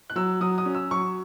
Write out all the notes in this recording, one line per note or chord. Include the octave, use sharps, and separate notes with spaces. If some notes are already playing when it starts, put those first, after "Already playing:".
F#6
F#3 E6
F#3 D#6
D#6
C#4
E6
F#3 C#6